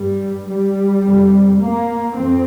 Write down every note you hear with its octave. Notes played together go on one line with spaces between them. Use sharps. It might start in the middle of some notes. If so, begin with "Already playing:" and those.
Already playing: G2 G3
G3
F2 C3
A#3
F2 C4